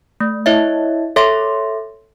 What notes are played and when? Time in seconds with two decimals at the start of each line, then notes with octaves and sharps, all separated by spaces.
0.20 A3
0.46 E4 C#5 D#5 E5
1.16 A4 C#5 E5 C6 A#6